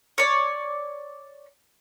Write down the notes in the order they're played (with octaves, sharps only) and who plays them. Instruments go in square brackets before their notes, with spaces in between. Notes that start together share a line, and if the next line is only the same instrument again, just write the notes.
[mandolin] C#5 D5